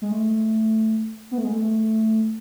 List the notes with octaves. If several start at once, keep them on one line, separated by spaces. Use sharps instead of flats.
G#3
A3
B3
A3
G#3
A3